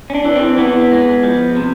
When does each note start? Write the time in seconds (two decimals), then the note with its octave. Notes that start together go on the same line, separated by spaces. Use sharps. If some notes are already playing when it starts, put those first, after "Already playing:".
0.10 C#4
0.14 D4
0.25 E3
0.36 C4
0.57 E3 B3
0.91 G#3
1.24 F3
1.57 C3